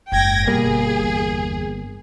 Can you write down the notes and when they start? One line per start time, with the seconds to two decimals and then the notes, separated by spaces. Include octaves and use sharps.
0.12 F#1 G#2 G5 G#6 A#6
0.47 G1 B2 G3 A#3 G#4
1.01 F#1 E2